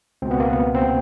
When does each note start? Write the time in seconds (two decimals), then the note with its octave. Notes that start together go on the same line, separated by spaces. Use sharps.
0.22 C#2 B2 C4
0.31 B3
0.40 A#3
0.49 B3
0.75 C4